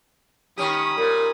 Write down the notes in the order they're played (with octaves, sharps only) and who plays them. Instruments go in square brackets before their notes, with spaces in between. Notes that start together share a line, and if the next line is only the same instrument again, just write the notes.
[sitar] D#3 C#4 G4 [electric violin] B5 D#6
[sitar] A#2 [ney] A#4